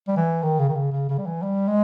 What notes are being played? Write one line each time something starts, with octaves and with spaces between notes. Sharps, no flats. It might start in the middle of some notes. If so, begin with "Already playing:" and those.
G3
E3
D#3
C#3
D#3
C#3
C#3
C#3
G3
E3
G3
G#3